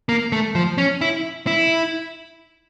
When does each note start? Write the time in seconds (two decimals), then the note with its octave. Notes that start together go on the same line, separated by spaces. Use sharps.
0.09 A#3
0.32 A3
0.55 F3
0.78 C#4
1.01 E4
1.47 E4